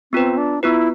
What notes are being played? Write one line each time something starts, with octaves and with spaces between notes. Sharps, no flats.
B3 C4 F4 B4
D4
B3 E4 F4 B4